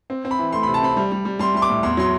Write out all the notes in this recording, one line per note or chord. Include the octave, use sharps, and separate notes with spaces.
C4
C4
B5
E3
A3 C6
C3 B5
A5
C4 B5
G3
G3
G3
G3 C6
G3 C6
D6
A2
E2 C6
F#3 C6